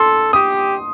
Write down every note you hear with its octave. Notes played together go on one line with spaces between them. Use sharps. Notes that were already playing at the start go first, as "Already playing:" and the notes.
Already playing: A4 C6
G4 D#6